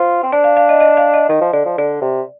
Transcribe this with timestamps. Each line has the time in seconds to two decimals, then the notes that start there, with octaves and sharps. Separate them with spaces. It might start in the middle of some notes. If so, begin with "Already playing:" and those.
Already playing: F4 C5
0.23 C4
0.32 D4 D5
0.44 F5
0.57 F5
0.69 D#5
0.80 D#5
0.97 F5
1.14 D#5
1.29 D#3 D#5
1.41 F3
1.53 D3 D5
1.66 F3
1.78 D3 D5
2.02 C3